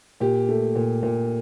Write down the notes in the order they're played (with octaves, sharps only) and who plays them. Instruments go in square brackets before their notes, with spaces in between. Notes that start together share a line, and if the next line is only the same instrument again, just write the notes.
[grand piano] A#2 G4
A3
A#2
A#2